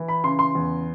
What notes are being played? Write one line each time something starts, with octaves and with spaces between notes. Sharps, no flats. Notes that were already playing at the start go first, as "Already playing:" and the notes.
Already playing: E3
B5
C#3 C6
C6
E2